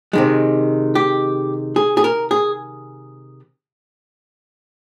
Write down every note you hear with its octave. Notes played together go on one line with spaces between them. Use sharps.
C3 D#3 G#3
G4
G#4
G#4
A#4
G#4